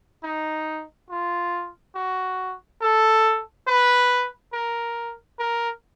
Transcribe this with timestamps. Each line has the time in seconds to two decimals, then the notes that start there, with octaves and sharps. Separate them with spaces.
0.24 D#4
1.10 F4
1.95 F#4
2.81 A4
3.67 B4
4.53 A#4
5.39 A#4